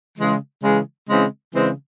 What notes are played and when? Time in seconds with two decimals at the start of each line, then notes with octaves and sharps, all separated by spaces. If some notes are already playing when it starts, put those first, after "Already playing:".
0.17 C#3 E3 G#3
0.62 C#3 E3 G#3
1.08 C#3 E3 G#3 C4
1.54 C#3 E3 G#3 C4